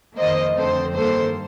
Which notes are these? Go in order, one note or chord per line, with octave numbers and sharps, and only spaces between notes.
F2 D#3 A#3 C5 D#5
F2 D3 A3 C4 A4 C5
G2 D#3 A#3 A4 C5